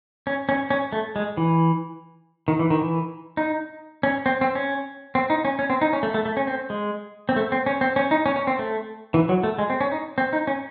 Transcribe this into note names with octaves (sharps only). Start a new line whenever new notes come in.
C#4
C#4
C#4
A3
G#3
E3
D#3
E3
D#3
E3
D#4
C#4
C4
C4
C#4
C4
D#4
C#4
C#4
C4
D#4
C#4
A3
A3
A3
C#4
C4
G#3
C4
A3
C4
C#4
C4
C#4
D#4
C#4
C#4
C4
A3
E3
F#3
A3
G#3
C4
C#4
D#4
C4
D#4
C#4